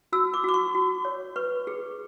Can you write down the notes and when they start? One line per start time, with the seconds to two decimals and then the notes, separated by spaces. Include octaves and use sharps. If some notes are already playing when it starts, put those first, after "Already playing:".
0.12 F#4 E6
0.34 D6
0.44 F#4 D6
0.54 C#6
0.75 F#4
1.05 C#5
1.36 B4 C#6
1.67 G#4